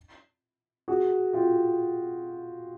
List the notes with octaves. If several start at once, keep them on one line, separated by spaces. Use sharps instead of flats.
F#4 G#4
F4 G4